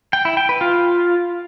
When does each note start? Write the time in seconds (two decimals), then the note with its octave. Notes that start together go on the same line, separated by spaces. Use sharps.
0.13 G5
0.25 E4
0.37 G5
0.49 B4
0.61 F4